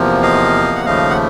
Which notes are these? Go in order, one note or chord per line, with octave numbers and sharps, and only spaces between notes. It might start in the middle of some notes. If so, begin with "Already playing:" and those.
Already playing: E2 C3 F3 A#3
D#5 F5
F#5
D#2 C#3 F3 A3 D#5 F5
F#5